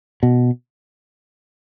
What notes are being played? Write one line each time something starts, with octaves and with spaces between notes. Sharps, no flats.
B2